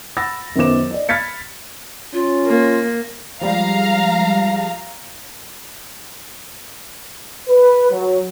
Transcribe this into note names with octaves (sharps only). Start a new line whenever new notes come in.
F#5 B5 E6 A6 A#6
F#2 D#3 B3 C5 D6 E7
D5 D#5
B5 F6 G#6 A6 B6 C#7
C#4 F4
A#3
F3 G3 G#3 F5 A#5
B4
F#3